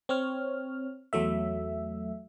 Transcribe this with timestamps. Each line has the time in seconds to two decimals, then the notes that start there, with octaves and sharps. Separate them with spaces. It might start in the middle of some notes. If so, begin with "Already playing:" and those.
0.09 C4 C#5 F6
1.13 E2 F#3 A3 E5